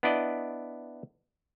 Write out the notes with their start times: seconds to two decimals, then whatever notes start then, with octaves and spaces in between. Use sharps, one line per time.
0.03 B3 D4 E4 D5 D#5